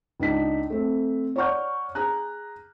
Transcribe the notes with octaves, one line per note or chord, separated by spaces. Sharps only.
C#2 D4 D#4 B6
A3 C4
C#5 D5 F#5 C#6 F6 G6
G#4 A#5 F#6